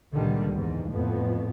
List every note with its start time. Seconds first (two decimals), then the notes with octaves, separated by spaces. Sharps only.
0.12 C#2 A#2 D3 D#3 G3
0.55 E2 G#2
0.90 F2 A2 B3